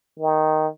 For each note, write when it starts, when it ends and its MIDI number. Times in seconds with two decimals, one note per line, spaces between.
0.19 0.67 51